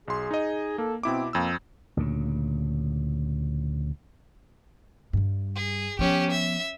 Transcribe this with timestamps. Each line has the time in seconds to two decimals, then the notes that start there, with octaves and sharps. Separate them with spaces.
0.08 B1 G#4 C6
0.31 D#4 D#5
0.78 A#3 A4
1.03 B2 C4 E4 D6
1.33 F2 A#3 E6
1.97 D2 A#2 C#3
5.13 G2 G3
5.56 G#4
5.99 F3 B3 C#4 G4
6.31 E5